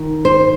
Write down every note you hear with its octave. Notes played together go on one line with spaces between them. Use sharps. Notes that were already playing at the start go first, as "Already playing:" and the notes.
Already playing: D#3
C5